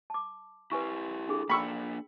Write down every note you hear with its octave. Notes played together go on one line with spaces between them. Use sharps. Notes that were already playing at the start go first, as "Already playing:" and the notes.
A5 D6
E4 G4 B4 G#5 C#6
D4 G#4 A4
A#3 D4 G5 B5 C#6 E6